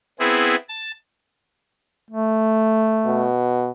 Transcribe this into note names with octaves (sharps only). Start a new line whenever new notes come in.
B3 C4 E4 G#4
A5
A3
B2